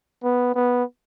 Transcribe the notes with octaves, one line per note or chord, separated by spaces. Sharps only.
B3
B3